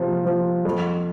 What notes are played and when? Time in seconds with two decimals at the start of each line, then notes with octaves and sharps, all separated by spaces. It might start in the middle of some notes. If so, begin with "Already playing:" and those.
Already playing: C3 F3
0.25 F3
0.65 F2